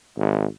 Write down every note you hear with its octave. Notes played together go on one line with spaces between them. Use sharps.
G#1